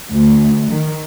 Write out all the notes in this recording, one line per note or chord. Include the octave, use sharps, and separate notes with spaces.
D2
D#3